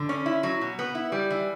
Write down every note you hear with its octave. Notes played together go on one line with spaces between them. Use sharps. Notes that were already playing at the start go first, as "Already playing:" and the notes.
Already playing: D3
C#4
E4
F#3
B2
B3
E4
G3
E3